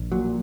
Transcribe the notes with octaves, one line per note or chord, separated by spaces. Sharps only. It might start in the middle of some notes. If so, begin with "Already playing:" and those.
Already playing: A#1
A#2 F#3